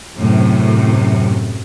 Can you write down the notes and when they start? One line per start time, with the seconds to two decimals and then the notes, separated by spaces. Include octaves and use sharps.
0.17 F#2 A2 C3